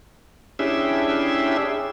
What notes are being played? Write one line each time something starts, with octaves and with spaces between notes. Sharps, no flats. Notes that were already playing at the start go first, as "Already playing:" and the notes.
C#4 D4 E4 G4 G#4 E5